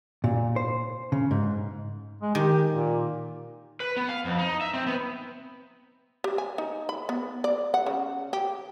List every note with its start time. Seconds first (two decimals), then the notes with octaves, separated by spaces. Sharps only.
0.24 A#2
0.56 C5
1.12 C#3
1.31 G#2
2.22 G#3
2.35 D#3 G4
2.69 A#2
3.80 B4
3.97 B3
4.09 F5
4.25 F2
4.39 D#4
4.61 E5
4.74 C4
4.87 B3
6.24 G4
6.38 G#5
6.58 D#4
6.89 B5
7.09 B3
7.44 D5
7.74 F#5
7.86 C#3
8.33 G4